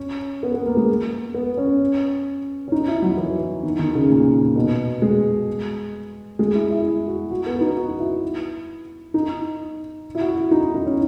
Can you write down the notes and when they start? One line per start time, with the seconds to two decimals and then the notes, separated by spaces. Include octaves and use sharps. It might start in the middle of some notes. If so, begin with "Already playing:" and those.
Already playing: C#4
0.43 B3
0.54 B3
0.66 A#3
0.77 G#3
1.34 B3
1.57 C#4
2.68 C#4
2.72 D#4
2.88 E4
3.02 F#3
3.18 E3
3.63 D#3
3.79 D#3
3.95 C#3
4.10 A#2
4.56 B2
5.02 G#3
6.39 G#3
6.54 E4
6.70 E4
7.07 F#4
7.31 F#4
7.46 B3
7.61 D#4
7.77 F#4
7.99 E4
9.14 D#4
10.15 E4
10.21 F#4
10.37 E4
10.51 D#4
10.74 D#4
10.86 C#4